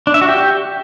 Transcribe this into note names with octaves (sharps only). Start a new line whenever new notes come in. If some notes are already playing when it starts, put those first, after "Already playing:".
D4
E5
F#4
G4